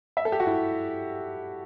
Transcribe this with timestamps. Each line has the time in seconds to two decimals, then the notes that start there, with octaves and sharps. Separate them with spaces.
0.17 E5
0.25 A4
0.32 G4
0.40 F#4
0.47 E4